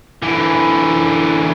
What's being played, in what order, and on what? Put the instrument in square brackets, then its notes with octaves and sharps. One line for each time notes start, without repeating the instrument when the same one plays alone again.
[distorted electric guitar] D3 E3